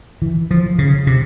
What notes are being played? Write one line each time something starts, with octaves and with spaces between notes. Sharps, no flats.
E3
F3
C#3
C3